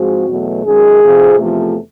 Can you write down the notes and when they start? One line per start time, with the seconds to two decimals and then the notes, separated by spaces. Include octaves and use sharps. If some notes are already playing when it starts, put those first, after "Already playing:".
Already playing: G#2 F3 G#3 C4 F#4
0.28 E2 B2 F#3 A3
0.64 F#2 D#3 G#3 G#4
1.02 F2 C3 F3
1.39 E2 C3 F3 A3